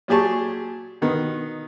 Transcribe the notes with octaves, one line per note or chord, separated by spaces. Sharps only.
A#2 F#3 G4 G#4 A5 C#6
B2 D#3 B3